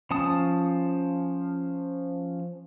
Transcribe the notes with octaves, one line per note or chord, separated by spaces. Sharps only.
F3 C#4 A5 D#6